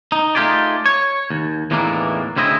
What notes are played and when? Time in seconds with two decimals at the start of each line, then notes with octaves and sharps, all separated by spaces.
0.12 D#4
0.35 A3 D#4 F4 G4 G#4 D5
0.86 C#5
1.30 D#2
1.71 E2 A2 D#3 E3 A#3 D4
2.36 D2 C#3 C4 E4 D#5